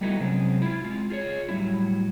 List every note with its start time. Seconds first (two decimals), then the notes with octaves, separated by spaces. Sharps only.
0.01 G3 A3 B3 D#4 E4 F#4
0.20 C3 F#3 G#3 C4 C#4
0.62 E4 F4
0.84 G#3 C4 F4
1.10 F4 G#4 C5 C#5
1.49 A2 F#3 G3 C#4 E4